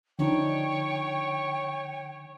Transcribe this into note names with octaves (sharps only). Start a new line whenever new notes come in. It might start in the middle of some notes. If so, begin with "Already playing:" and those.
D3 F3 D4 D#4 C#5 G5